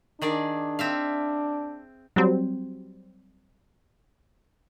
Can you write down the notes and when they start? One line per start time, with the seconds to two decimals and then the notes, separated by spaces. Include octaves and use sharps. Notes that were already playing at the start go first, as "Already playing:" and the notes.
0.22 D#3 D4 G#4 D5
0.79 C4 E5 F5
2.16 F#3 G3 C4